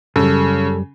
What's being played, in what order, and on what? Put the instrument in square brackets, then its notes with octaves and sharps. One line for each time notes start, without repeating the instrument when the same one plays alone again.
[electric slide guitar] F#2 G3 [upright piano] C#3 [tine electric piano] A4